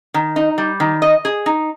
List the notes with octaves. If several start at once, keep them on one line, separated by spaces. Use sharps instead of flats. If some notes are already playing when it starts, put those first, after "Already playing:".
D#3
D#4
G3
D#3
D#5
G#4
D#4